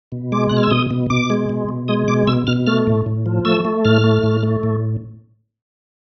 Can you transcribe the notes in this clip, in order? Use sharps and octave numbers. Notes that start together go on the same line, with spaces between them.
B2
G#3 D6
B2 F#6
F6
E6
B2 D#6
B2
B2 D6
G#3
B2
B2
G#3 D#6
B2 D6
B2 E6
B2 F6
A3 F6
A2
A2
F3
A3 E6
A3
A2 F6
A3
A2
A3
A2